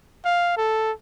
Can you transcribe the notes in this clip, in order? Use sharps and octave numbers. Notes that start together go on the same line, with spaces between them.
F5
A4